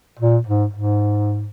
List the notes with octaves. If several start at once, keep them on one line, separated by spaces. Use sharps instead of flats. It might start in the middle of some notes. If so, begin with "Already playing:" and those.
A#2
G#2
G#2